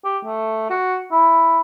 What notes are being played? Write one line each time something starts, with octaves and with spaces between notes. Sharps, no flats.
G4
A3
F#4
E4